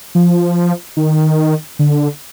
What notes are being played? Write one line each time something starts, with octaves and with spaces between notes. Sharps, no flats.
F3
D#3
D3